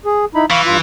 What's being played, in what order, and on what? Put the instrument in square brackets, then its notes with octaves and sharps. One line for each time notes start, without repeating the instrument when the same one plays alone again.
[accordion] G#4
D#4 E4 B5
[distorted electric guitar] E3 [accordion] F5 B5 C#6
[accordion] G2 F4